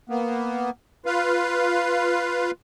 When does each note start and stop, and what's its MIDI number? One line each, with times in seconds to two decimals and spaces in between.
0.09 0.70 58
0.09 0.70 59
1.06 2.51 65
1.06 2.51 71
1.06 2.51 77